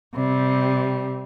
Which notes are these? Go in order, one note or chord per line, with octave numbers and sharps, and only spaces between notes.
C3 G3